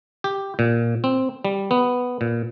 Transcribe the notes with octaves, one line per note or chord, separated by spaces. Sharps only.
G4
A#2
C4
G3
B3
A#2